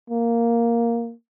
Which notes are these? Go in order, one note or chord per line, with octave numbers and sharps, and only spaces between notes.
A#3